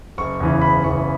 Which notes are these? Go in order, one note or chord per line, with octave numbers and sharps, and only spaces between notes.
F#1 C#6
E2 C#3 E3
F#1 B5
E2 C#3 E3 C#6